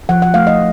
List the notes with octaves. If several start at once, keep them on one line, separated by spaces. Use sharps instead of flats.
F3 F#5
F#5
A3 F5
D#5